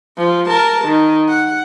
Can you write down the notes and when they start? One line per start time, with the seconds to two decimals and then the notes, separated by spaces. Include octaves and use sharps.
0.17 F3
0.47 A#4 A5
0.85 D#3
1.29 F#5